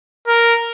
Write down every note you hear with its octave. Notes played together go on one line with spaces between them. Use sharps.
A#4